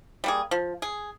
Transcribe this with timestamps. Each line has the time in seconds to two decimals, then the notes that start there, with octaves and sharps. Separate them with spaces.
0.24 G3 A#3 G#4
0.51 F3
0.82 G#4